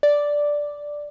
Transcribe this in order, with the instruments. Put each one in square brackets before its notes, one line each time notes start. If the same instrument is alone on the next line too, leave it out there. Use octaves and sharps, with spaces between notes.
[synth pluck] D5